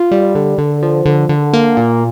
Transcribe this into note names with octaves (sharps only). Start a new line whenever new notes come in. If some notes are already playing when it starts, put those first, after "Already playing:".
Already playing: F4
G3
D3
D3
F3
D3
D3
A#3
A#2